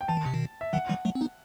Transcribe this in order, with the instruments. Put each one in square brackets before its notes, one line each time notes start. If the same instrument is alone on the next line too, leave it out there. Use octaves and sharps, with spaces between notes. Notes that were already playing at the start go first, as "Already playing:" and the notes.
[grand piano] G5
[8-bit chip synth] E3 [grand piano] A5
[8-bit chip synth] D#3
C3
B2 D#3
[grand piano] E5
[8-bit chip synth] D#3 F#3 [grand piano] F#5
[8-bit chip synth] E3 G3
F#3 A3
C4
B3 D#4